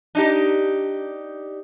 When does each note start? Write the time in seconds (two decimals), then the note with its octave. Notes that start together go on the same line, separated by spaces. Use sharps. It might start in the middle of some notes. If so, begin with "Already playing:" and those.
0.15 D4 D#4 G4